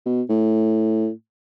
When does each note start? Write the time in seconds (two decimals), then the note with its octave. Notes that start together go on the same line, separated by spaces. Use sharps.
0.06 B2
0.29 A2